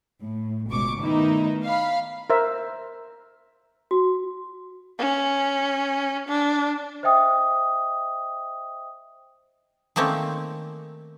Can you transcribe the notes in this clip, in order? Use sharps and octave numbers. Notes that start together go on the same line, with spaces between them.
A2
G1 C#2 B2 C#6 D6
D#3 A3 B3 D#4 E4
F5 B5
A#4 C5 E5
F#4
C#4
D4
C5 D#5 E5 G5 D#6
D#3 A3 A#3 C4 C#4